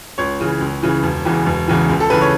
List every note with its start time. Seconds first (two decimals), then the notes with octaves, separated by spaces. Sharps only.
0.18 C#2 C#5
0.40 C#3 E3
0.61 C#2
0.82 C#3 E3
1.03 E1
1.25 E2 C#3 E3
1.46 E1
1.68 E2 C#3 E3
1.89 C#2
2.00 A4
2.10 C#3 E3 B4
2.21 C#5